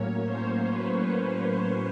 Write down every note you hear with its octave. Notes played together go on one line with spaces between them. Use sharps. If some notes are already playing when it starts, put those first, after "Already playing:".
Already playing: A2 F#3 A#3 C#4 C#5
C5
B4